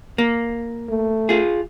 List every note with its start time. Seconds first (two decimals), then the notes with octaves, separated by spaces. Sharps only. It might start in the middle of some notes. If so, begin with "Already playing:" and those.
0.18 A#3
0.89 A3
1.29 F4 G#4